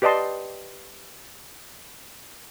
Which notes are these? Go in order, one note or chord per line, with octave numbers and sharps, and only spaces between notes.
G4 B4 D5 D#5 A5 C6